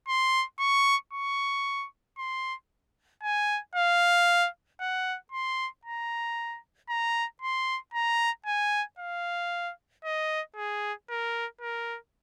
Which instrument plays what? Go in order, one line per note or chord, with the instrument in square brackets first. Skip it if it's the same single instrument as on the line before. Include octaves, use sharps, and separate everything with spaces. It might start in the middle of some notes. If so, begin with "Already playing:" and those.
[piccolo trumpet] C6
C#6
C#6
C6
G#5
F5
F#5
C6
A#5
A#5
C6
A#5
G#5
F5
D#5
G#4
A#4
A#4